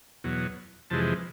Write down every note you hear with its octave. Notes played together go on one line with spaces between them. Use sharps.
E2 B2 F#3
F2 C3 E3 G#3 A5